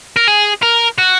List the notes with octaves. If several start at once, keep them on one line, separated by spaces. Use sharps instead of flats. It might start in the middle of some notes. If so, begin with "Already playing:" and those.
A#4
G#4
A#4
F#4